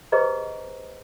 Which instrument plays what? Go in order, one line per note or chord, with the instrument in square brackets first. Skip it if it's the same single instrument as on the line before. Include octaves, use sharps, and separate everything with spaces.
[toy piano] G4 G#4 B4 C5 D#5 A#5